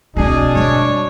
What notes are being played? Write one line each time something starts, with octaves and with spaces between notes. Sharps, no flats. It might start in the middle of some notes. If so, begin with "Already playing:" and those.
B2 C4 D4 E4 G#4
G3 C#5